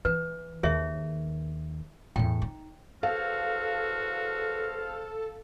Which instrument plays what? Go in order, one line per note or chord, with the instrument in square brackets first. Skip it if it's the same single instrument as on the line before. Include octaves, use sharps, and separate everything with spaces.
[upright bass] E3 [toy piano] B4
[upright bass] D#2 D#3 [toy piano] G#4 C#5 E5
[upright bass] E2 A2 [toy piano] G5
[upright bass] D#4
[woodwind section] E2 C5 F6 [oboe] F#4 [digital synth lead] A4 [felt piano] F5